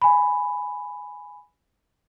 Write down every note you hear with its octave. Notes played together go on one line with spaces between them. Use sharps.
G#5 B5